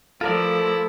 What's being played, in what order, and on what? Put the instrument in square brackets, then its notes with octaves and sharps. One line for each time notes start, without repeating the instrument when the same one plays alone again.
[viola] F3 A3 [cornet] E4 [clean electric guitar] F4 A#4 D5 [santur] A4